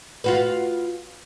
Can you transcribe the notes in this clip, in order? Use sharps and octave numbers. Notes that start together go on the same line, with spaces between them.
F4 F#4 B4